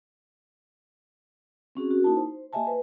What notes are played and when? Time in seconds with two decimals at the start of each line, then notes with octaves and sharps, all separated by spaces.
1.75 C4 C#4 F#4 G#4
1.91 F#4 A#4
2.04 A#3 D#4 E4 A5
2.17 C5
2.53 A#3 G4 D#5 E5 G#5 A5
2.67 B4 C5